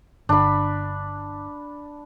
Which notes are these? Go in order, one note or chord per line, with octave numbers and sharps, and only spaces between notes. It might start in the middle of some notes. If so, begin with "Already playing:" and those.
G1 D4 B5